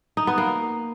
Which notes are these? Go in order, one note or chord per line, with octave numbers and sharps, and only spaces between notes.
D#4
B3
A#3